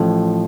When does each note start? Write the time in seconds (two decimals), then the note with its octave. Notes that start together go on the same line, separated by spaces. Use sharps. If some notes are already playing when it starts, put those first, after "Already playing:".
Already playing: A1 A2 F3